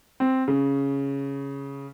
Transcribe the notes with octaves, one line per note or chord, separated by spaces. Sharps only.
C4
C#3